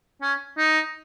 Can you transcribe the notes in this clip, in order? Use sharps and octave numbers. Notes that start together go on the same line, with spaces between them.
C#4
D#4